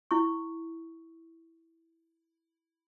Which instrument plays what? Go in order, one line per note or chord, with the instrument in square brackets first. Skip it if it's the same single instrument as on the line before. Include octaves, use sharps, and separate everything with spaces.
[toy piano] E4 C#6